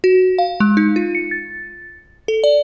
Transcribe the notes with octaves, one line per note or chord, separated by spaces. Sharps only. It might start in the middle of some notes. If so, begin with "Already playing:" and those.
F#4
F5
G#3
D#4
F4
C#7
A6
A4
D5